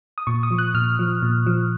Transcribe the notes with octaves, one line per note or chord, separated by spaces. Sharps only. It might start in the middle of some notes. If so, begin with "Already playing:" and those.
D#6
A#2 C#6
D#6
F3
F#6
A#2 F6
F3
A#2
F3